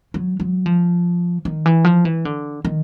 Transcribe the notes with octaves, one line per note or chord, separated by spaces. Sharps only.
F#3
F#3
F3
D#3
E3
F3
E3
D3
D#3